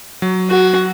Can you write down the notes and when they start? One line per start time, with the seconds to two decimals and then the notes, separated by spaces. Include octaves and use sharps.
0.22 F#3
0.50 F#4